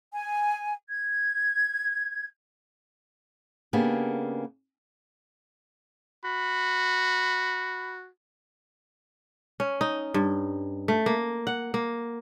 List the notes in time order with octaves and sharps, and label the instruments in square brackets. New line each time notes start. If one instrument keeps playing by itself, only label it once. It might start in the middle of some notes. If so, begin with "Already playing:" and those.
[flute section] G#5
G#6
[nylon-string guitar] C#3 A#3 B3 D4 G4 G#4
[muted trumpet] F#4 [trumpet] B5
[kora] C#4
D#4
G2
A3
A#3
F#5
A#3